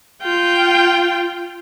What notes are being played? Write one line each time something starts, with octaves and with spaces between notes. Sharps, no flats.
F4 G5